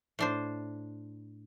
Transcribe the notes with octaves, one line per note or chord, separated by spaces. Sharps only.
A2 D4 C5